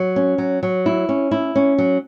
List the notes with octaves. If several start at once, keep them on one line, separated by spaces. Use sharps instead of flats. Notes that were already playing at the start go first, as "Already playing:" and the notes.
Already playing: F#3
C#4
F#3
F#3
E4
C#4
E4
C#4
F#3